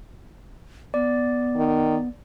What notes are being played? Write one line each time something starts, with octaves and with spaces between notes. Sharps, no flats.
B3 D5
D#3